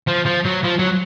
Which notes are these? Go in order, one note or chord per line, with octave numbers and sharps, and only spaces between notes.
F3
F3
F#3
F3
F#3